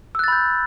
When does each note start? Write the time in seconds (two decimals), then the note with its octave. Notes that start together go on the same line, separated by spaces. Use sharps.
0.15 E6
0.19 F#6
0.24 A6
0.28 B5
0.32 G6